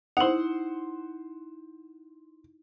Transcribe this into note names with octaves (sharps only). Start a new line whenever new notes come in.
D#4 E4 C5 F#5